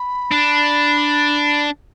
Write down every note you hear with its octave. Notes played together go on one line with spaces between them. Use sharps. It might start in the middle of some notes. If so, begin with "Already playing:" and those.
Already playing: B5
D4